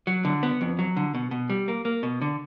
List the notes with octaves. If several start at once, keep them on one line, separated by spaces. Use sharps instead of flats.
F#3
D3
B3
F2
F#3
D3
B2
B2
G3
A#3
A#3
B2
D3